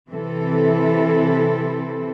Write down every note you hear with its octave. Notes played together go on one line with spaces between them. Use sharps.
C3 E3 C4 E4 A4